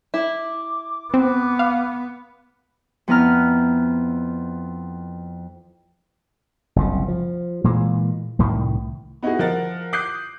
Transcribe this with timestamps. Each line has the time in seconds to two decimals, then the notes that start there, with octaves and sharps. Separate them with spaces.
0.14 E4 D6
1.14 B3 C4
1.59 F5
3.08 F2 B3 E4 B4 A#5 F6
6.76 F#1 C2 C#3
7.08 F3
7.64 A#2 E3 G#3
8.39 C2 A2 D#3
9.23 B3 D#4 E4 F#4 G#4
9.39 F3 A#4 F#5 A6
9.93 D6 D#6 F#6 G6 C7